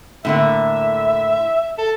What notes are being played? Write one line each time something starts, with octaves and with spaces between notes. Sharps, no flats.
A2 D3 A#3 E5
A4